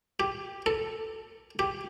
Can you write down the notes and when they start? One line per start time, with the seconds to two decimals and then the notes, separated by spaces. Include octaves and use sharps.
0.20 G4
0.66 A4
1.59 G4